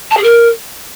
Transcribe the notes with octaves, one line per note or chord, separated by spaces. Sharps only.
A5
G#4
A#4